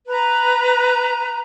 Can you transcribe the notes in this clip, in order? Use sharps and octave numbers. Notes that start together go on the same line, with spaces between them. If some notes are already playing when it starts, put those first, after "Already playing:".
B4 A#5